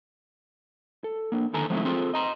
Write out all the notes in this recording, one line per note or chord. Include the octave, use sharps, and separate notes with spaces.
A4
A#3 D4
E2 D3 D#3 A4 G#5 A#5
F3 G#3 A3 C4 D#4 E4
C4 F4 G#4 A4
D#5 A#5 C6